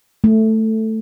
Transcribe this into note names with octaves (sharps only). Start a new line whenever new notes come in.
A3